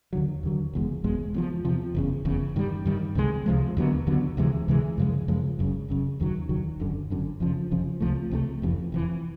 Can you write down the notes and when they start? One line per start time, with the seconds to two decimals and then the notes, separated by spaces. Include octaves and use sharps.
0.13 D#2 D3 F#3
0.43 D#2 D3 F#3
0.73 F#1 E2 B2 G#3
1.04 F#1 E2 B2 G#3
1.34 E2 C3 F3
1.65 E2 C3 F3
1.95 F#1 E2 C#3
2.25 F#1 E2 C#3
2.56 G2 D#3 G3
2.86 G2 D#3 G3
3.15 C#2 C3 F3 G#3
3.46 C#2 C3 F3 G#3
3.77 D#2 D3 F#3 B3
4.07 D#2 D3 F#3 B3
4.37 D2 C3 E3 G#3
4.68 D2 C3 E3 G#3
4.98 F#2 C#3 F3 G#3
5.28 F#2 C#3 F3 G#3
5.59 F#1 F#2 C#3
5.88 F#1 F#2 C#3
6.20 F1 D#2 D#3 F#3
6.49 F1 D#2 D#3 F#3
6.80 G1 F#2 D3
7.10 G1 F#2 D3
7.40 F1 F2 C#3 F3
7.71 F1 F2 C#3 F3
8.01 C#2 C3 F3 A3
8.31 C#2 C3 F3 A3
8.62 F1 F2 C3 E3
8.92 F1 F2 C3 E3